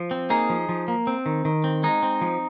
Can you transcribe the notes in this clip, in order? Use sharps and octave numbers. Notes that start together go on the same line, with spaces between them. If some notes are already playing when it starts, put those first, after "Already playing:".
Already playing: F3
C4
A#3 D#4 G#4
F3
F3
A#3
C4
D#3
D#3
C4
G#3 D#4
C4
F3